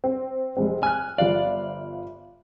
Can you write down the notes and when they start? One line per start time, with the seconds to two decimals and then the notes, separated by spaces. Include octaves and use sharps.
0.04 C4
0.57 F1 G#3 C4
0.83 G#5 F6 F#6
1.18 G1 F3 D5 F5